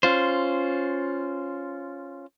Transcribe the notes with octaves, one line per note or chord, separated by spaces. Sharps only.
C#4 F4 C5